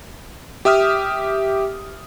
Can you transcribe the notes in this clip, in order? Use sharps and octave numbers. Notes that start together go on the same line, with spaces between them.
G4 E5 D#6 F6